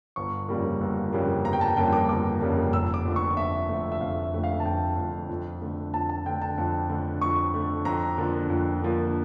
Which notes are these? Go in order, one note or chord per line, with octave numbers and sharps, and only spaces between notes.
G1 C#6
F2 C#3 G3 A#3
G1
F2 C#3 G3 A#3
G1 A#5
G5
A5
F2 C#3 G3 A#3 G5
D6
G1 D6
F2 C#3 G3 A#3
F1 E6
D6
F2 D3 A3
C#6
F1 E5
F2 D3 A3
E5
F1 F5
E5
F2 D3 A3
F5
A5
F1 G5
F2 D3 A3
F2
D3 A3
F2 A5
A5
D3 A3 G5
A5
F2
D3 A3
F2 C#6
D3 A3
F2 A#5
D3 F3 A#3
F2
D3 F3 A#3